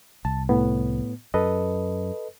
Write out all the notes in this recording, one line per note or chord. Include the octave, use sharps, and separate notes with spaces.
C2 A5
A2 B3
F#2 A4 B4 D#5